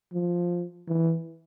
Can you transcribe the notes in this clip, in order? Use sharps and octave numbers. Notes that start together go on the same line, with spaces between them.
F3
E3